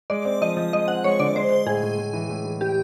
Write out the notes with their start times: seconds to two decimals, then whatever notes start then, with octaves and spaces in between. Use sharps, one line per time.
0.10 G#3 D5
0.25 C4
0.41 F3 D#5
0.57 F3
0.73 G#3 D#5
0.88 C4 F#5
1.04 G#3 C#5
1.20 D3 D5
1.36 G#3 C5
1.50 G#3
1.66 A2 G#4
1.83 A2
1.98 A2
2.13 E3
2.30 A2
2.45 E3
2.61 G4